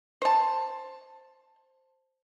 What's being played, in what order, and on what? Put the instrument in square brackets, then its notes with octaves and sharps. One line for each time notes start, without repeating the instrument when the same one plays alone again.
[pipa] C5 A5